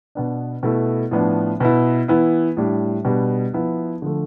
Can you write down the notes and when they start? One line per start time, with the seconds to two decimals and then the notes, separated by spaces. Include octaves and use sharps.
0.15 B2 B3 D4
0.63 B2 A3 E4
1.11 A2 F3 B3 D4
1.60 B2 B3 E4
2.08 E3 B3 E4
2.57 A2 G3 D4
3.05 B2 G3 D4
3.53 F3 B3 E4
4.02 D3 F3 A3